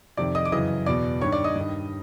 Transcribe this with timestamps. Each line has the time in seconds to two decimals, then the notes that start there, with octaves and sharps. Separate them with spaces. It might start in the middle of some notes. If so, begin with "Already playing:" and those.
0.17 F2 C3 D#3 D5 D6
0.35 D#5 D#6
0.45 D6
0.52 F#2 C#3 E3 D#5 D#6
0.86 E2 B2 D5 D6
1.21 G2 D#3 C#5 C#6
1.32 D5 D6
1.44 D#5 D#6
1.56 G2 D#3